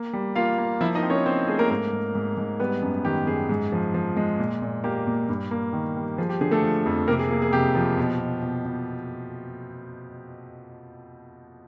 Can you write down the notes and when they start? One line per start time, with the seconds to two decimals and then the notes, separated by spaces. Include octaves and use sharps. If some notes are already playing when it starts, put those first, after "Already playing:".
Already playing: A#3
0.13 G3
0.35 A#3 F4 F5
0.58 A#3
0.81 F3 E4 E5
0.95 D#4 D#5
1.03 C4
1.10 C#4 C#5
1.26 C4 C5
1.48 A3 G#4
1.59 A#3 A#4
1.70 G#2 A#3 A#4
1.93 G#2
2.15 G#2
2.37 G#2
2.60 G3 B3 B4
2.82 F#2
3.05 D#3 G4
3.27 F#2 G#4
3.49 G#2
3.72 F3
3.94 F3
4.16 G#3
4.39 A#2
4.62 A#2
4.84 A#3 G4
5.07 A#2
5.29 G2
5.51 A#3
5.73 D#3
5.96 G3
6.18 F3 G#4
6.29 G4
6.41 D3 G#4
6.52 A3 A4
6.63 F3
6.86 F2
7.07 C3 A#3 A#4
7.19 G#4
7.30 A#3 G#4
7.42 G#4
7.53 C3 G4
7.75 F3
7.97 B2
8.19 B2
8.42 B2
8.65 B2